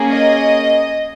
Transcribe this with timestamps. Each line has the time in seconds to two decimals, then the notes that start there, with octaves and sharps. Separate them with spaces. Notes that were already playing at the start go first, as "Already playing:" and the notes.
Already playing: A#3 C#4 G#4
0.11 D#5